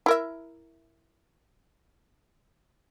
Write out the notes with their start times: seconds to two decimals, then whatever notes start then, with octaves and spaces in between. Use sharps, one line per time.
0.06 E4 A#4 E5